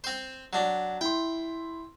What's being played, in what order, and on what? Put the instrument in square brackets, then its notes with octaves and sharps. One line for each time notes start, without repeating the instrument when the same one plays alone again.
[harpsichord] C4 C5
F#3 D4
[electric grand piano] E4 C6 [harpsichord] G5